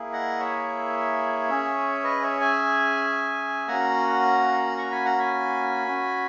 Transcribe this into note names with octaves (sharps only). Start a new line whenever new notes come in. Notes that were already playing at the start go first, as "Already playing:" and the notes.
Already playing: A#3 E4 G#4
D#5 F#5
C#5 E5
C#4 G#4
B4 D#5
C#5 E5
E5 G#5
A#3 C#4 F#4 F#5 A#5
A#5 C#6
G#5 B5
F#5 A#5
G#5 B5
C#4 F#4